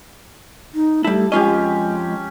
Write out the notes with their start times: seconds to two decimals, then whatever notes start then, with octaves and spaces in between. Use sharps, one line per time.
0.74 D#4
1.05 G3 A3 E4 A5
1.32 F2 G#3 C#4 F4 G4 D#5